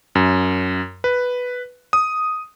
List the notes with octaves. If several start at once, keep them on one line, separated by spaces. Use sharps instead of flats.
F#2
B4
D#6